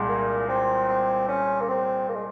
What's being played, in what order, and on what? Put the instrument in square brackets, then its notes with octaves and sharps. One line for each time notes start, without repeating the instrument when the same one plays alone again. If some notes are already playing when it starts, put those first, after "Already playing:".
Already playing: [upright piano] C2 A#2 G#3
[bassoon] A#3
C4
C4
C#4
A#3
C4
A#3
G#3